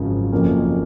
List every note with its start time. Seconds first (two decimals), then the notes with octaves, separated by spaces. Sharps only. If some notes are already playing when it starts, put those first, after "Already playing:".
Already playing: G#1 F#2 C#3 F3
0.32 F#1 F2 F3 A#3 C#4